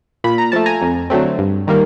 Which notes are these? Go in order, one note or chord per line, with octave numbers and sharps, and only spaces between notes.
A#2 B5
A#5
F3 A3 A5
G#5 A#5
F2
D3 F#3 A3 C4
G2
D#3 G3 A#3